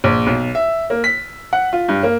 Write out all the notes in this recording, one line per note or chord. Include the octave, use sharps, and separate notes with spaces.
A#1
B1
E5
A#3
B6
F#5
F4
G2
A#3